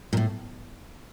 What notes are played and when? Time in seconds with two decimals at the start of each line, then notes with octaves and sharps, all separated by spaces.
0.13 A#2
0.17 A2